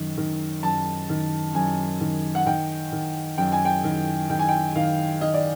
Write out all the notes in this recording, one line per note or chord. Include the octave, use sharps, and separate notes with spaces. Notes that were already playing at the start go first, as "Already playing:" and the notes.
Already playing: F#2 D#3
D#3
F#2 A5
D#3
F#2 G#5
D#3
F#5
D#3 G5
D#3
F#2 G5
G#5
G5
D#3
D#3 G5
G#5
G5
D#3 F5
D#3 D#5
D5